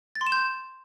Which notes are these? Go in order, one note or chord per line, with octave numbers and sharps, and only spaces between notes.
A6
C6
E7
G6